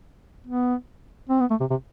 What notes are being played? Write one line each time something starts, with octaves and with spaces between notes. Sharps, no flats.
B3
C4
B3
A3
C3
C3